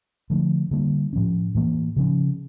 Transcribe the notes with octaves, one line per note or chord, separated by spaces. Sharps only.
D3 F3 A3 D4
D3 G3 A#3 D4
A2 F3 C#4
A2 E3 A#3
C#3 F3 C#4